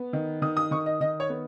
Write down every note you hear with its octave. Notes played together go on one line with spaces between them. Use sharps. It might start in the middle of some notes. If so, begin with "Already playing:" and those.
Already playing: B3
D#3
D#3 D#6
D#6
D#3 C#6
D#5
D#3 D#5
C#5
B3